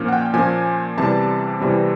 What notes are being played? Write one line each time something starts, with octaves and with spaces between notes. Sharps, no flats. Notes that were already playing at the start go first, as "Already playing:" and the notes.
Already playing: A#2 F3 A#3 C#4
F#5
G5
G5
A#2 F3 A#3 C#4 G#5
E2 C3 E3 G3 C4 A5
E2 C3 E3 G3 C4